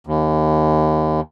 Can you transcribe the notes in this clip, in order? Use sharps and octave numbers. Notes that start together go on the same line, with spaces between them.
D#2